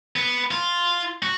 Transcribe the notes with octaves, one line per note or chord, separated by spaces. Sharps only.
B3
F4
F#4